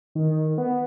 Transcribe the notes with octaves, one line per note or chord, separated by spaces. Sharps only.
D#3
B3